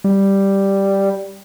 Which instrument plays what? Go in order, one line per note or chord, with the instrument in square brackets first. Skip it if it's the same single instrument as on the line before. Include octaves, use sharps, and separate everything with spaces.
[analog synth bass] G3